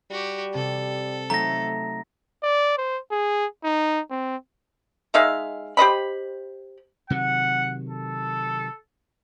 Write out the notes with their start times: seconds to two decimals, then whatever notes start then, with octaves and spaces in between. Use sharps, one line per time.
0.11 G3 F#4 G4
0.54 C3 A4
1.30 F#3 A3 D#4 A#5 A#6
2.43 D5
2.78 C5
3.11 G#4
3.64 D#4
4.11 C4
5.14 G#3 D#4 E5 F5
5.77 G4 C5 D#5 B5
7.10 C3 D#3 F#3 F#5
7.89 A4